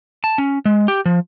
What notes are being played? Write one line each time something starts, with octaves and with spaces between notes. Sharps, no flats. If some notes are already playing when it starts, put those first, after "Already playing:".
A5
C#4
G#3
G4
F3